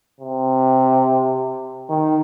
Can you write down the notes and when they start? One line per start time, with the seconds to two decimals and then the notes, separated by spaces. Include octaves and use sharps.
0.21 C3
1.90 D#3